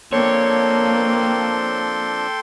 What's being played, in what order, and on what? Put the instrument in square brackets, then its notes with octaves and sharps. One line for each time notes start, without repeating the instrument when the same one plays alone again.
[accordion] F3 C4 D4 [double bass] A#3 [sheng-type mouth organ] A4 G5 C6 [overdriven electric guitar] C#5